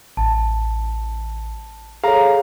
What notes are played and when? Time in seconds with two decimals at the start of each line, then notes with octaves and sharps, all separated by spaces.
0.17 A1 A5
2.04 G#4 A4 C#5 F5 A#5